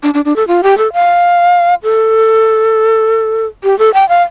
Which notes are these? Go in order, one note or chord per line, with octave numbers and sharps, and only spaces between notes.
D4
D4
D4
A4
F4
G4
A4
F5
A4
G4
A4
G5
F5